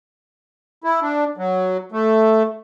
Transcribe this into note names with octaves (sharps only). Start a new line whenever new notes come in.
E4
D4
F#3
A3